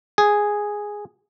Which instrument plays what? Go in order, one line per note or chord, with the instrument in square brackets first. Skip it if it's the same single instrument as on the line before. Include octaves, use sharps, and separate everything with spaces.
[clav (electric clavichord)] G#4